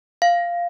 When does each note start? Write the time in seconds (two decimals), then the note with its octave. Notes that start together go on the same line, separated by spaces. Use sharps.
0.22 F5